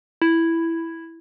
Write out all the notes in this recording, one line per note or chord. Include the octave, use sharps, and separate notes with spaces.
E4